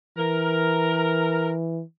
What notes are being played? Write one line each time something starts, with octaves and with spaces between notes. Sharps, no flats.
E3 A#4